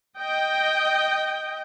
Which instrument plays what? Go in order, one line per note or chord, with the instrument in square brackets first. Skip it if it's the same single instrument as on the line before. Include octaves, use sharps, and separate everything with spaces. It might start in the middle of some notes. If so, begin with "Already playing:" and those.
[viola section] D#5 G5